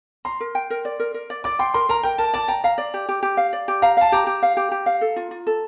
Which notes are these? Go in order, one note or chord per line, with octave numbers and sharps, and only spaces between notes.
A#5 C6
A#4
G5
A#4
D5
A#4
A#4
D5
D5 D6
G5 C6
A#4 C6
A#4 A#5
A#4 G5
A#4 A5
D5 A5
G5 A#5
F5 A#5
D5
G4
G4
G4
F5
D5
G4
F5 A#5
F5 A5
G4 A#5
G4
F5
G4
G4
F5
A4
F4
F4
A4